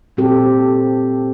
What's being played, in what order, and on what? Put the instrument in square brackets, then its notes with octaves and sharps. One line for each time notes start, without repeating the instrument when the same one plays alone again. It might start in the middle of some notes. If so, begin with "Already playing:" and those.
[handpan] A#2 C4 G4 A4